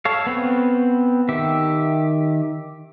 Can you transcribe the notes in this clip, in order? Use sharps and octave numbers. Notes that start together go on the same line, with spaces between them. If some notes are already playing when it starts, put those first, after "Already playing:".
A4 C#5 F5
B3 C4 B4
D#3 G4 E5